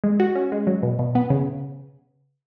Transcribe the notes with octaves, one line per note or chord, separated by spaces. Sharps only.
G#3
F#4
C#4
G#3
F#3
B2
B2
B3
C#3